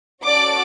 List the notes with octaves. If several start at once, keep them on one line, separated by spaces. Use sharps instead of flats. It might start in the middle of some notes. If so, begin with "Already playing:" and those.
C#4 F#4 A4 D5 D6